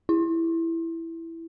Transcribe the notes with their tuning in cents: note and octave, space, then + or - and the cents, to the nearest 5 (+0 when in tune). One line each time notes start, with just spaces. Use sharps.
E4 +5